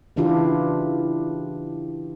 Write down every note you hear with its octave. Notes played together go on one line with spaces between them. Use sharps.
C#3 E3 D4 E4 F4 G4